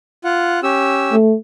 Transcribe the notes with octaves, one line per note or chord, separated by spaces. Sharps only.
F4 F#5
C#4 G4 E6
A3